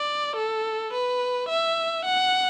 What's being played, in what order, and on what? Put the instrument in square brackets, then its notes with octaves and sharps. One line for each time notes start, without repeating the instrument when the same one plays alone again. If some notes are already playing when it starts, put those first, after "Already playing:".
Already playing: [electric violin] D5
A4
B4
E5
F#5